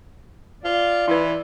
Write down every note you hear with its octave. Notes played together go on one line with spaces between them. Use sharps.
F4 D5
E3 E4 B4